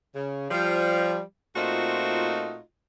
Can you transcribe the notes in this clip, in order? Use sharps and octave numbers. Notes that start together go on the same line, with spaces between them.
C#3
F3 G3
A#2 A3 C4 D#4 F4 F#4